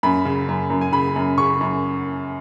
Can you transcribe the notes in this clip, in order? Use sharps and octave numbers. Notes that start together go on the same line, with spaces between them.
F#2 B5
C#3
F#2
F#2
G#5
C#3 B5
F#2
C#3 C#6
F#2